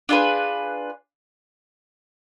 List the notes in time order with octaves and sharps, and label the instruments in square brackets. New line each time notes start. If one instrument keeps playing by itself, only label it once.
[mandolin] D4 F4 G#4 B4